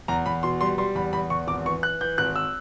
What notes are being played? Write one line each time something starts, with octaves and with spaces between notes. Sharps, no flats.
E2 A#5
E2 B5
B2 C6
G3 C6
G3 C6
E2 B5
E2 B5
E2 C#6
G#1 D6
E3 C#6
E3 F#6
E3 G6
G#1 F#6
E6